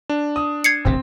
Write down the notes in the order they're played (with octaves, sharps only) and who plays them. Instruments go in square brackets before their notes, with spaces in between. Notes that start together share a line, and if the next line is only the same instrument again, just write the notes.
[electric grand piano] D4
[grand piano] D#6
[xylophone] G#6 C7 C#7
[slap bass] D1 G#1 C3 [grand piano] C4